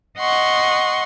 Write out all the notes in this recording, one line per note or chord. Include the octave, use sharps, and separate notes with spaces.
D#5 F#5 C6 C#6